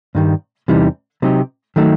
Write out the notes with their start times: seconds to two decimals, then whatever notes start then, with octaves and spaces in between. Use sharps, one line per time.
0.15 G2 D#3 G3
0.68 E2 C3 E3 G3 D#4
1.22 C3 F#3 C4 D#4 G4
1.76 D#3 F#3 A3 D#4